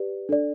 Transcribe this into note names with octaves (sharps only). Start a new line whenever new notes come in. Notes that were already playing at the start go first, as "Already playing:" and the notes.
Already playing: G4 B4 D5
D4 A4 D5